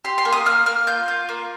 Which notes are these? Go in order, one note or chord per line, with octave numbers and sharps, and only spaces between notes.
G4 C6
C6
A#3
D#6
A#3 F6
A#3 F6
F4 G6
F4
A#3